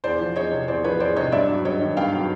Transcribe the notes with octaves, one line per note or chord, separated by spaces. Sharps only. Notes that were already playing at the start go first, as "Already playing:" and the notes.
E2 C5 D5
F3
E2 C#5 D#5
C3
E2 C5 D5
F3 B4 C#5
E2 C5 D5
C3 C#5 D#5
G2 D5 E5
F#3
G2 C#5 D#5
D#3
G2 F5 G5
F#3